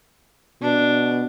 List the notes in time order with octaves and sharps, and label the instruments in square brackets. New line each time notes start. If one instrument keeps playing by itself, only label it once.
[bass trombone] B2 [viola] D4